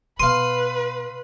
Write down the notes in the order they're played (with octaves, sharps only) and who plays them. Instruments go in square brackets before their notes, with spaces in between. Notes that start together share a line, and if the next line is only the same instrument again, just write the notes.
[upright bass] B2 [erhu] B4 [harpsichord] F5 C6 [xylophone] D#7